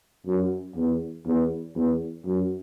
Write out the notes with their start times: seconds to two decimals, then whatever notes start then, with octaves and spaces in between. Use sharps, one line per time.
0.26 F#2
0.76 E2
1.26 E2
1.75 E2
2.25 F#2